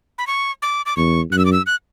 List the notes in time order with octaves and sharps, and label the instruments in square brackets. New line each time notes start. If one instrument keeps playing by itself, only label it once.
[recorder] B5
C#6
D6
D6
[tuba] E2 [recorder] C#6
[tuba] F#2 [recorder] F#6
[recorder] E6
D6
E6
F#6